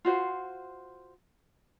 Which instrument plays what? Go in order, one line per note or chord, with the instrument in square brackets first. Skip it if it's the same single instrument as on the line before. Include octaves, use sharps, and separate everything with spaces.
[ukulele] F4 F#4 C5